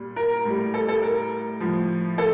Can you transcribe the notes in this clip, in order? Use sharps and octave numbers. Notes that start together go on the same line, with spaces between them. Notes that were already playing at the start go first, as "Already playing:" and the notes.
Already playing: A#2 G3
A#4
A2 G3
A4
A4
A#4
A2 F3
A4